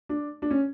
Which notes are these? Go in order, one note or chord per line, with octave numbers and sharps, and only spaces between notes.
D4
D4
C#4